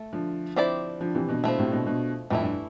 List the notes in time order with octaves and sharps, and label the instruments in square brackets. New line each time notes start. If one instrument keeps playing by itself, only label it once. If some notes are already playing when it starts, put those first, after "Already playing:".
Already playing: [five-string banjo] A3
[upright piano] D3 F3
[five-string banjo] C4 E4 G4 D5
[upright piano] D3 F3
C3 E3
B2 D3
[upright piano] B2 D3 [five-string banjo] F3 A3 E4
[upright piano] A2 C3
B2 D3
B2 D3
[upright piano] F2 A2 [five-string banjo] E3 A3 E4
[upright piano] G2